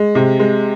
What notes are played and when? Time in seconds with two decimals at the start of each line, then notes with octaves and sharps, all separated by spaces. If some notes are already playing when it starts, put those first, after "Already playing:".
Already playing: G#3
0.15 C3
0.40 G#3